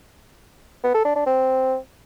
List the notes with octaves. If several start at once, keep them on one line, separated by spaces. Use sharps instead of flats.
B3
A4
D4
D4
C4